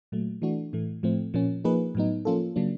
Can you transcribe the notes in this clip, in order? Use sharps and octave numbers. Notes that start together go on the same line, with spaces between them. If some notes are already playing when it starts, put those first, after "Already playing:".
A#2 F#3 A3
E3 A3 D4 F#4
A2 E3 A3
A2 F3 A3 C4
A#2 F3 A#3 C#4
F3 A#3 D#4 G#4 B4
A2 F#3 B3 D#4
F3 A#3 C#4 F4 A4
C#3 F#3 A#3 D4